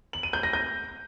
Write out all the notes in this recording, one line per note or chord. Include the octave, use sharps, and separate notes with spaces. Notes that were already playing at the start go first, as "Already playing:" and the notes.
F#7
D#7
G6
A#6
G6